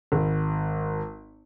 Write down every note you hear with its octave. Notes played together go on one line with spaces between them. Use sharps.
G#1